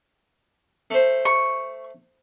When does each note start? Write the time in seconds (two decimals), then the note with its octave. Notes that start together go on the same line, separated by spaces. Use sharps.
0.91 A3 C5
1.25 C#6